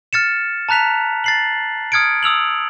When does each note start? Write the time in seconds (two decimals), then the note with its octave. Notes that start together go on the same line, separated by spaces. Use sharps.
0.13 F6 A6 C#7 E7
0.69 A5 A#5 F#6 B6 F7
1.24 A6 C7 F#7
1.92 D#6 F6 G#6 C#7 D7
2.23 D#6 E6 F7 F#7